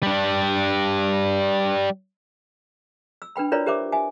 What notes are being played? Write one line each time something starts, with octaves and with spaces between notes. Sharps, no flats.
G3 D4
E6
D4 B4 G5 B5
E4 F4 A#4 B4 C#5 D5
G4 A#4 C5 E5 D6
E5 G#5